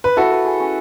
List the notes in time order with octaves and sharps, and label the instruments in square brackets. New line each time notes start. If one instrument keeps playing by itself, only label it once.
[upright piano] B4
[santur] E4 [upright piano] F#4 A4
[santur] B4
G#4
C#4